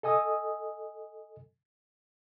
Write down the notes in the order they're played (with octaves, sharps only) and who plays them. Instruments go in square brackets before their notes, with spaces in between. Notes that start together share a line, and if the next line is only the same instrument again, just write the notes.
[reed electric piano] A4 D#5 G#5 D#6